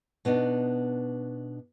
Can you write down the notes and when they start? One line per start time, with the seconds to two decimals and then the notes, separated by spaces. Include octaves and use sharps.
0.25 B2 B3 D4 D#4